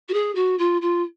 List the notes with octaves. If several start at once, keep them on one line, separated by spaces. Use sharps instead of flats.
F#4
G#4
F#4
F4
F4